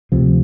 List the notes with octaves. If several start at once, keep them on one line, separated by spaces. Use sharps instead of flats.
D2 C3 F3